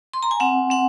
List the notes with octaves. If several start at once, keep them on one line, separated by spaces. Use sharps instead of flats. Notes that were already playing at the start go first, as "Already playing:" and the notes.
C6
A#5
G#5
C4 F#5
C4 F#5